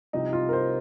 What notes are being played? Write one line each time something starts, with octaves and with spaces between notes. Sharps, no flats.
C2 C3 F3 D#4
F4
A#4
C5